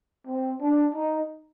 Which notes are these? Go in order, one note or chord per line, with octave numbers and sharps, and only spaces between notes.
C4
D4
D#4